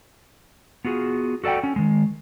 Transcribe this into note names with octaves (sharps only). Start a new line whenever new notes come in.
B3 F4 F#4 G#4
F#4 A4 D5 F#5 G5
C#4
D#3 G#3